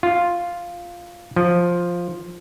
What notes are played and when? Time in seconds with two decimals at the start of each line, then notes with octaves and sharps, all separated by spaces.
0.03 F4
1.36 F3